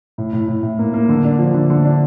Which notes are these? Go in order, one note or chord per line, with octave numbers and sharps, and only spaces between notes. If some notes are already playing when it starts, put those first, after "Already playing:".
A2
A2
A2
A2
A#3
A#3
D3
D4
F3
D3
D3
D4